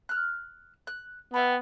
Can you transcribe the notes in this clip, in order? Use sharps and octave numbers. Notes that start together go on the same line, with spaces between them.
F6 F#6
F#6
B3 E5 G5 B5